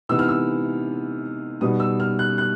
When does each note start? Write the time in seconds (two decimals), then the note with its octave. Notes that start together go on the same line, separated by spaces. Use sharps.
0.09 C3 E3 G#3 B3 D#4 E6
0.19 F6
0.29 E6
1.61 B2 G3 B3 D#4 D#6
1.80 E6
2.00 F6
2.19 F#6
2.38 F#6